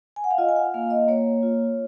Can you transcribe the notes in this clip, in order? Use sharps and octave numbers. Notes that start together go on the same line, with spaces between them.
G#5
F#5
F5
F4 D#5
G#5
F#5
A#3 F5
D#5
A#3 C#5
F4